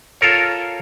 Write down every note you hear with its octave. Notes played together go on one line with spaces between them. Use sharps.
F4 A4 A#4 C#5